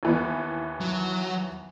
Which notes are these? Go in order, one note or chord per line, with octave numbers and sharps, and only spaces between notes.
D#2 E3 B3
F#3